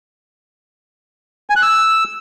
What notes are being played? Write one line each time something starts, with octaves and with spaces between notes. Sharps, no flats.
G#5
F#6
E6